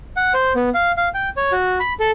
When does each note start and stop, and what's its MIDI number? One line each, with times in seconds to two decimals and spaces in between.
0.17 0.33 78
0.34 0.53 72
0.56 0.70 59
0.74 0.92 77
0.97 1.09 77
1.14 1.29 79
1.37 1.52 73
1.52 1.79 66
1.80 1.93 83
2.00 2.11 69